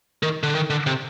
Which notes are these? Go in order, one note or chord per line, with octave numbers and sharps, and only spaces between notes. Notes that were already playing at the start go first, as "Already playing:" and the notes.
D#3
D3
D#3
D3
C3